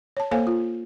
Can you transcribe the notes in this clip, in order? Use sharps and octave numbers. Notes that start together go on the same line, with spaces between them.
C#5 A5
A#3 A4 C5 C#5 F5 G#5
F4